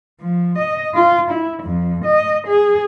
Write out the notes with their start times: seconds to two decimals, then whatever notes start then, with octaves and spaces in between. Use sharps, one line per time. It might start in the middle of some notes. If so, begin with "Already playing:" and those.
0.21 F3
0.58 D#5
0.94 F4
1.30 E4
1.63 F2
2.05 D#5
2.47 G#4